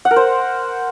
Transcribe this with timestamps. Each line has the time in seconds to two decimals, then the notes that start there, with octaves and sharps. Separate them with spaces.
0.05 F#5
0.11 A#4
0.16 C5